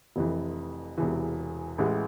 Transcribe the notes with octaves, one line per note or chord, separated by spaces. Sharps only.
F1 F2 E3
E1 E2 C3 E3
A1 A2 E3 G#3